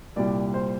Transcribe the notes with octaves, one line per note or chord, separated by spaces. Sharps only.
C2 A#2 G3 D5
C5